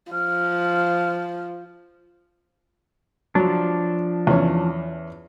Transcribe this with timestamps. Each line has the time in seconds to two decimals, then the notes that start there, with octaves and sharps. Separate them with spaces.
0.12 F3 F6
3.35 F3 F#3 D4
4.27 E2 C#4